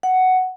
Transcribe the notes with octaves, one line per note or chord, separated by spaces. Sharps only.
F#5